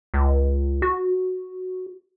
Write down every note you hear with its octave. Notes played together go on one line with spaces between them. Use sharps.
C#2
F#4